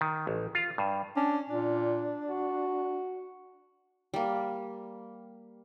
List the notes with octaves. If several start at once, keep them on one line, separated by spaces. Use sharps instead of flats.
D#3
A1
F4
G2
C#4 D4
A#2 D4
F#4
G3 A#3